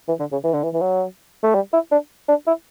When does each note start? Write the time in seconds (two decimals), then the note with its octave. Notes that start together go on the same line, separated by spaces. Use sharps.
0.08 E3
0.20 D3
0.32 C#3
0.44 E3
0.54 D3
0.63 E3
0.74 E3
0.81 F#3
1.43 A3
1.55 G3
1.73 E4
1.92 D4
2.29 D4
2.47 E4